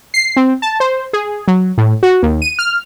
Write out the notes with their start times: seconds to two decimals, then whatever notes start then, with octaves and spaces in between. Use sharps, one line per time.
0.14 C7
0.37 C4
0.62 A5
0.80 C5
1.13 G#4
1.48 F#3
1.78 A2
2.03 F#4
2.23 D#2
2.42 D#7
2.59 F6